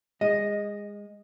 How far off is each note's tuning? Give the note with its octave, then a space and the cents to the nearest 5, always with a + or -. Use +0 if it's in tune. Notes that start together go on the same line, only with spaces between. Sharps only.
G#3 -25 D#5 +0